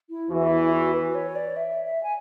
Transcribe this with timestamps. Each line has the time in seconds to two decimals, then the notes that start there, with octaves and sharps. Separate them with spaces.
0.10 E4
0.30 E2 E3 F#4
0.51 E4
0.73 F#4
0.93 B4
1.15 C#5
1.36 D5
1.57 E5
1.84 E5
2.03 G#5